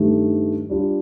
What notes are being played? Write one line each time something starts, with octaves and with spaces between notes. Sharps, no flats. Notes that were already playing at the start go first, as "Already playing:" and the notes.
Already playing: G2 D#3 A3 D#4 G4
G3 D4 F4